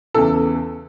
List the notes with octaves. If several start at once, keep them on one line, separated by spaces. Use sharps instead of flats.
E2 C#3 E3 A4